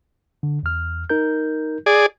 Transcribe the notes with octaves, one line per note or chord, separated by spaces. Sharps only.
D3
E2 F6
D#4 A#4 G6
G#4 D5